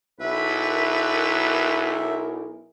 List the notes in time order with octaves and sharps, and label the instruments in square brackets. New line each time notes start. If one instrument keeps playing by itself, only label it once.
[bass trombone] B1 [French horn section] E4 G#4 A#4 [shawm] B4 [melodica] E5